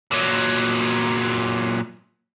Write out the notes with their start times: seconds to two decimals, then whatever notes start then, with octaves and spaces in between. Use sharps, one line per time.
0.12 A#2 F#3